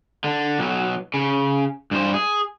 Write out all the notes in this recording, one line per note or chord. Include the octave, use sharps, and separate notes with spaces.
D3
B1 F#3
C#3
G2 C5
G#4